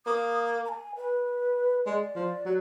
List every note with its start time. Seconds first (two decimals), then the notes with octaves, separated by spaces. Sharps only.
0.06 A#3 D#6
0.65 A#5
0.69 G#5
0.96 B4
1.85 G#3 D5
2.16 F3
2.45 F#3